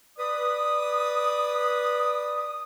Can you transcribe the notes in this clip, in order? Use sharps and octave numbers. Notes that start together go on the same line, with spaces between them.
B4 D5 D#6